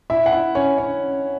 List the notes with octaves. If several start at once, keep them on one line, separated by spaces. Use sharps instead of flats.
E4 E5
F#5
E4 E5
C#4 C#5
C#4 C#5